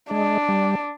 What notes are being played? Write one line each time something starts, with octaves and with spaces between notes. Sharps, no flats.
G#3 D4
G3